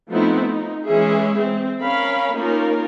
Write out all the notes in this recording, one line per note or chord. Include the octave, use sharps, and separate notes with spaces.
F3 A3 B3 C4 D#4 E4
D#4
E3 G#3 C#4 G#4 E5
C4
C#4 A#4 F5 B5
A#3 C#4 D#4 F4 A#4